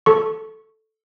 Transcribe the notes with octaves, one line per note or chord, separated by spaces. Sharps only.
A4 C#6